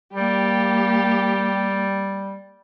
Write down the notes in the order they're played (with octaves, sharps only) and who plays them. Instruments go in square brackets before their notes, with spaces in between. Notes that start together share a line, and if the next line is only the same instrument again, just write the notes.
[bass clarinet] G3 [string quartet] A#3 G4